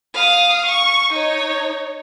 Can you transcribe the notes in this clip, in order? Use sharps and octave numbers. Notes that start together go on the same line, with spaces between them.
F5 D#6
C#6
D#4 C#5